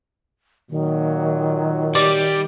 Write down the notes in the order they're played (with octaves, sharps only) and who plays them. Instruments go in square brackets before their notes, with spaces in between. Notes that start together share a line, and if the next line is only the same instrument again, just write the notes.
[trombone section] A#2 F#3 [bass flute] D#3
[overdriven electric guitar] G3 [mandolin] D5